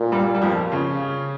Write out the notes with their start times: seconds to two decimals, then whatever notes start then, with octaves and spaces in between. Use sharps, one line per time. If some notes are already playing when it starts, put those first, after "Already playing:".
Already playing: A#2
0.12 G2 G3
0.35 G3
0.42 F2 F3
0.72 C#3 C#4